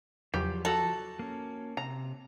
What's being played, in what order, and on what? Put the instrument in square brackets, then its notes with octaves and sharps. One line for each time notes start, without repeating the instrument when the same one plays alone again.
[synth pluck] E2 C#3 F#3 [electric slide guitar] F3 [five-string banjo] G4
[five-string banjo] F#4 A#5 [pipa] A4
[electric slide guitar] A#3 C#4
[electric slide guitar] C3 [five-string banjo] A#5